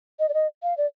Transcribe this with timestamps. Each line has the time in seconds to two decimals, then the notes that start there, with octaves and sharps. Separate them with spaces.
0.20 D#5
0.29 D5
0.34 D#5
0.63 F5
0.77 D5